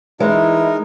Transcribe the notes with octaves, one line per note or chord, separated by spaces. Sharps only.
E3 G#3 D#4 E4 A#4